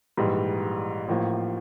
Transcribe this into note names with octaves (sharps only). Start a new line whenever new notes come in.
A#1 G#2 E3 G3
A1 A2 F3 A#3